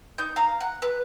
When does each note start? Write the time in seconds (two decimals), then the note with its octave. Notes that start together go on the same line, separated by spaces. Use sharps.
0.18 D#4 G6
0.36 F5 A#5
0.60 F#5
0.82 B4